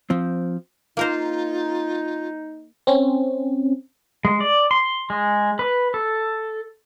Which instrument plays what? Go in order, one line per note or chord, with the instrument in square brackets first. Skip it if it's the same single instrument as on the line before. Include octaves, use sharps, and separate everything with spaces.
[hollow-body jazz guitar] F3 C4
[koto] A#3 A#4 C5 [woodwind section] D#4 [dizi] F4
[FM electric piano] C4 C#4
[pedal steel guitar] G#3
D5
C6
G#3
B4
A4